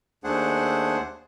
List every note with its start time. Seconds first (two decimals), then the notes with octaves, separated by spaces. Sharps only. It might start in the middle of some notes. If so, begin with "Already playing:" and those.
0.24 D#2 A3 D4 G#4 C5 F#5